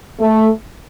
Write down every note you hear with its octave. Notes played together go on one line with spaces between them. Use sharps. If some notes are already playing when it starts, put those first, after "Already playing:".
A3